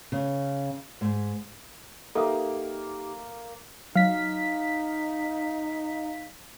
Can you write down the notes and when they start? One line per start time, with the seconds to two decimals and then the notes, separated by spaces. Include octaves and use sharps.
0.12 C#3
1.01 G#2
2.15 A#3 D#4 G4 A4 D#5 E5 D#6
3.95 F#3 D#4 F5 B6